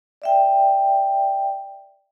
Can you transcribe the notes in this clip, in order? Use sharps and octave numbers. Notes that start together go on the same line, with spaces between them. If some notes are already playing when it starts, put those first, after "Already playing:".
D5 E5 G5